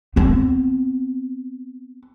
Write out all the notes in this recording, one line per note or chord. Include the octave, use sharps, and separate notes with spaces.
B3 C4